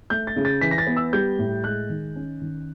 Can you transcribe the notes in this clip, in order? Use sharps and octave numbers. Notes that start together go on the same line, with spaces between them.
A3 G6
A6
C#3
A6
E3 B6
A#6
A6
B3
E6
G3 G6
A2
G#3 F#6
D#3
C#4
D#3